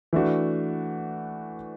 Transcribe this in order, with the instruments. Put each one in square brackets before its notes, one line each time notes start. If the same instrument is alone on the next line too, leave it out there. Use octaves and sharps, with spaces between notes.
[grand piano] E3 A3 D4 F#4